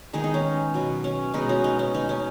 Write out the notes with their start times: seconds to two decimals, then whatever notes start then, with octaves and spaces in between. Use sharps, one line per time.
0.13 D#3 G#3 B3 D#4 G#4
0.24 D#4
0.34 C#4
0.74 B2 F#3 B3
1.04 C#4
1.34 B2 G#3 B3 D#4
1.49 C#4 F#4
1.64 D#4
1.79 C#4
1.94 B2 B3 D#4
2.09 C#4